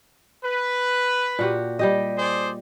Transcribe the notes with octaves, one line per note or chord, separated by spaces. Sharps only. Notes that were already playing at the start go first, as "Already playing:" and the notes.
B4
A#2 F#4 G4
G3 G4 D#5
G#4 C5 D5